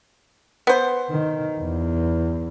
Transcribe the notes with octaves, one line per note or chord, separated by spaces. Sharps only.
B3 C5
D#3
E2